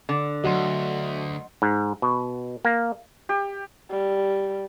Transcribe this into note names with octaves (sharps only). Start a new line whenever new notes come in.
D3
D2 F#3 D#5 F#5 C6
G#2
B2
A#3
G4
G3